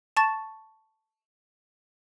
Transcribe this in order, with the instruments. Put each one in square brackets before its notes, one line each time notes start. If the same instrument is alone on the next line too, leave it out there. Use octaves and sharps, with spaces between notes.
[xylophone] A5 C#6 A6 E7